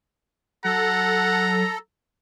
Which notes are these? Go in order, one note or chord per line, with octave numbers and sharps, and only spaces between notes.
F#3 A4 F#5 A#5